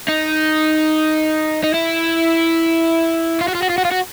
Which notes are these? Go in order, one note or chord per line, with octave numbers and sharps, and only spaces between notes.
D#4
D#4
E4
F4
F#4
F4
F#4
F4
F#4
F4
F#4